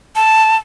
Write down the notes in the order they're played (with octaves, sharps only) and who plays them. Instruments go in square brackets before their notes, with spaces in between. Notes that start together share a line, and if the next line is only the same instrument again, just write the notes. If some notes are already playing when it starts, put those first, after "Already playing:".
[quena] A5